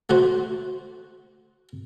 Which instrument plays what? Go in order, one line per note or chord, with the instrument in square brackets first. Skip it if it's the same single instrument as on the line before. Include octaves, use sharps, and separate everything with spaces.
[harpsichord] A3 F#4 C5